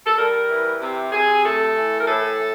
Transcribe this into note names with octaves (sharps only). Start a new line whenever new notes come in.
A4
G3 A#4
E3
C3
C3 G#4
A3 A4
E3
A#4
A2 A4
A2